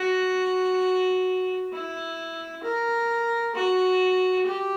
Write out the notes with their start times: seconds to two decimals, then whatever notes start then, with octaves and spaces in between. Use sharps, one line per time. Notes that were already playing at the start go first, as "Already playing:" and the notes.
Already playing: F#4
1.72 E4
2.64 A#4
3.55 F#4
4.46 G4